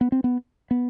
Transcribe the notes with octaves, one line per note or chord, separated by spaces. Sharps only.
B3
C4
B3
B3